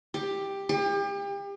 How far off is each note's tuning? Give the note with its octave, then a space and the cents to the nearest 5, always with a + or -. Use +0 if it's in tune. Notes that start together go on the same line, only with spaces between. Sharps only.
G4 +10
G4 +35